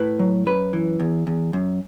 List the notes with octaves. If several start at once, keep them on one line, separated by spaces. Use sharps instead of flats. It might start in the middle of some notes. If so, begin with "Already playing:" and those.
Already playing: A2 B4
F#3
F#2 B4
E3
E2
E2
F#2